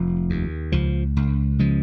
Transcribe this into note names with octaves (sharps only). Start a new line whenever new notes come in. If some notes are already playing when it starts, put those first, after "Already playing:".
Already playing: F1 F3
D#2
C#2 F3
C#2
C#3 F3 G#3